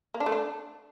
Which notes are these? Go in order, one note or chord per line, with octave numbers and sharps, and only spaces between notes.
A#3
D4
A3
D4